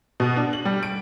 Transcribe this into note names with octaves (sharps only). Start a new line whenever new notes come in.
B2
D4
F#7
G3
D7